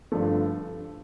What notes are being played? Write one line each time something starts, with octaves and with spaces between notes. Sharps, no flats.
G2 D3 F3 A3